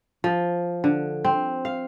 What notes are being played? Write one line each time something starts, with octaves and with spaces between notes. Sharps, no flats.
F3
D3
C4
F5